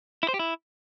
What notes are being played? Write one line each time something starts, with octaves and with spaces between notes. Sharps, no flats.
E4
C5
G4
E4